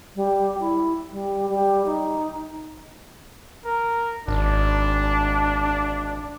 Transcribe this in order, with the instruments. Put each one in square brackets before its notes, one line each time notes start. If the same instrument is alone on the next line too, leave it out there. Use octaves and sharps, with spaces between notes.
[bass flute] G3
E4
G3
G3
D#4
[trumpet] A#4
[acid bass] G#1 [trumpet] D4